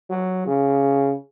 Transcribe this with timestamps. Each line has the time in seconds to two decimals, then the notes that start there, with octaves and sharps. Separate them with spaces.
0.10 F#3
0.47 C#3